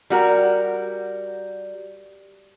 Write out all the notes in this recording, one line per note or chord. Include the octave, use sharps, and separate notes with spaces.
G3 F#4 A#4